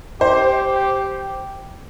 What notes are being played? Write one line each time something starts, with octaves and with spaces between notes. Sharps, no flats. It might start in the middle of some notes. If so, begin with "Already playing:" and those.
G4 C5